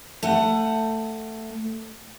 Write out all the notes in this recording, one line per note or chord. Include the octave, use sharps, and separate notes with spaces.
A3 F#5